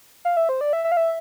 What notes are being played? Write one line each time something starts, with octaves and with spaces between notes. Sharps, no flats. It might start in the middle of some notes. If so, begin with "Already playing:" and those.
F5
E5
C5
D5
E5
E5
F5
E5